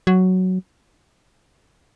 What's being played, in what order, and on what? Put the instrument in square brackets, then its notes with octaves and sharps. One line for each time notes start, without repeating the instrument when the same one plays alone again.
[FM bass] F#3